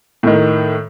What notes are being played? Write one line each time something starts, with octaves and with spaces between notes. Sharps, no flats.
A2 D#3